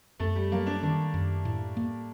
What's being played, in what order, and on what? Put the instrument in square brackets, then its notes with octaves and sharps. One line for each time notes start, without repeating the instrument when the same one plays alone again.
[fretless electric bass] F#2 [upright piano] A3
[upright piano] G3
[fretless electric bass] F#3 [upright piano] A#3
[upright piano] D4
[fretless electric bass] D#3 [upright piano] D4
[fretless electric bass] F#2
A2
A#3